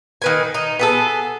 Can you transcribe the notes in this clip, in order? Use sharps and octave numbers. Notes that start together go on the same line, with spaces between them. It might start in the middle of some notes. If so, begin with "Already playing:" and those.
D#3 B4 G#5
D#4
B3 G#4 A4